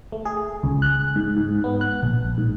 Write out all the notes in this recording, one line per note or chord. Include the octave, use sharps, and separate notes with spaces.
A3
G#4
C#2
F#6
G#2
G#2
B3
F#6
A#1
G#2